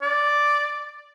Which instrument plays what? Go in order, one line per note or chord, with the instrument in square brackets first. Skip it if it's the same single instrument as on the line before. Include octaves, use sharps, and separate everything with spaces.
[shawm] D5